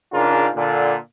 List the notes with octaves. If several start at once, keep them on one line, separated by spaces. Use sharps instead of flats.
G#2 C#3 D4 F4 A#4
A#2 D3